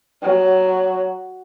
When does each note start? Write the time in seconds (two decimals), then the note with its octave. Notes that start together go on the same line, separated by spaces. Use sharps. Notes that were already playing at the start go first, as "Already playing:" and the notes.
0.22 F#3